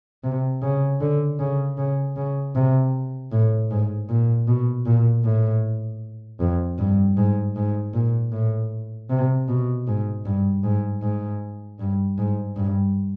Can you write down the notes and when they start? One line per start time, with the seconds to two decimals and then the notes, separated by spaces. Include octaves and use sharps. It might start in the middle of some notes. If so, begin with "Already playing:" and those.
0.24 C3
0.62 C#3
1.01 D3
1.40 C#3
1.78 C#3
2.16 C#3
2.55 C3
3.32 A2
3.71 G#2
4.09 A#2
4.48 B2
4.86 A#2
5.24 A2
6.40 F2
6.79 G2
7.17 G#2
7.56 G#2
7.94 A#2
8.32 A2
9.10 C3
9.48 B2
9.87 G#2
10.25 G2
10.64 G#2
11.02 G#2
11.80 G2
12.18 G#2
12.57 G2